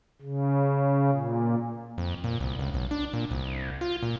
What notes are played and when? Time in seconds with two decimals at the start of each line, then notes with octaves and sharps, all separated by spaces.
0.22 C#3
1.11 A#2
1.98 F2
2.24 A#2
2.40 C2
2.59 C#2
2.74 B1
2.91 D4
3.13 A#2
3.31 C2
3.81 F4
4.03 A#2